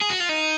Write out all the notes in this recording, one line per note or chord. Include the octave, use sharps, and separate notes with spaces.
G#4
F#4
F4
D#4